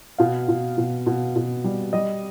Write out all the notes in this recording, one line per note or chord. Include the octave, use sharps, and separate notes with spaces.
B2 F5
B2
B2
B2
B2
G3
G3 D#5